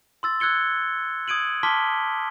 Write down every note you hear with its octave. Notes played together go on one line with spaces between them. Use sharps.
C6 E6 A6
E6 F#6 G#6 C#7 G7
D#6 G#6 D7 D#7 F#7
A5 C6 D6 F6 B6 G7